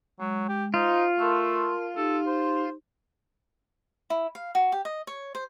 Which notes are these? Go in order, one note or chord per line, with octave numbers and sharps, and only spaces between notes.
F#3 G#3
G4
D#4 F4 C5
A3 A#4 A5 C6
D#4 G4 A4
C5
E4
F5
F#4
G4
D#5
C#5
C5